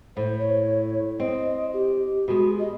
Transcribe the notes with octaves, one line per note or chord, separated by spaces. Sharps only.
A2 C5
C#5
C4 D#5
G4
B2 G#3 F#4
D#5